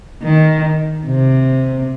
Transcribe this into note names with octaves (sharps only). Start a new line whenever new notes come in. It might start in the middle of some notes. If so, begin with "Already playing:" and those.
D#3
C3